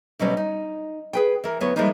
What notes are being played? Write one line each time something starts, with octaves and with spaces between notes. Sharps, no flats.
D2 B2 F#3 G3 C#4
D#4
G#4 B4 G5
E3 A#4
D2 F#3 B3 E4 C#5
E3 F3 G3 G#3 A#3 D#4